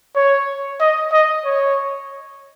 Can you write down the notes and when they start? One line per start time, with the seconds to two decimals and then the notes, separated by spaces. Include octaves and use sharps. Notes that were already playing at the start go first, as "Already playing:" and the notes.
0.16 C#5
0.80 D#5
1.12 D#5
1.45 C#5